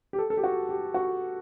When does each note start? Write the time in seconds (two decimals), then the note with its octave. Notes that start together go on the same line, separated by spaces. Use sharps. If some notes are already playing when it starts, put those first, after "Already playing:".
0.13 G4
0.19 A4
0.30 A4
0.37 G4
0.44 F#4
0.69 G4
0.94 F#4